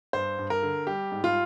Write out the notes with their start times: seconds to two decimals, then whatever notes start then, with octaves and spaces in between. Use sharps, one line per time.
0.13 G2 C5
0.38 G2
0.50 A#4
0.63 D3
0.87 G3 G4
1.12 G#2
1.24 F4